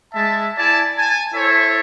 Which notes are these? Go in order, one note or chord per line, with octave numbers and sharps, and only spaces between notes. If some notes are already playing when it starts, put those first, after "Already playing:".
G#3 E5 A5
E4 D5 G#5 A5
G#5 A5
E4 A4 C5 C#5 E5